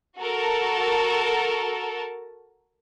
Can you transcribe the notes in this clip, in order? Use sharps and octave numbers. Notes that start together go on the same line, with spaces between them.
F#4 A4 A#4 A5